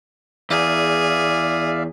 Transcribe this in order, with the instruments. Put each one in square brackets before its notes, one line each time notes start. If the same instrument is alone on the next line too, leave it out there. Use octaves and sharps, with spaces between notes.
[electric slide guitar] E2 [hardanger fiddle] G#4 [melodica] D5 E5 F5